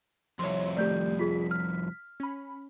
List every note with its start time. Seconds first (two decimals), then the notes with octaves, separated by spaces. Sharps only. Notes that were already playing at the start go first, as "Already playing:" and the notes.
0.39 C2 F2 C#5 E5 C6
0.76 D#3 A3 G4 D5 G6
1.19 F4 G#4 B6
1.51 F6
2.20 C#4 B5